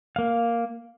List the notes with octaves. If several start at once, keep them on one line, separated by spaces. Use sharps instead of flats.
A#3 F5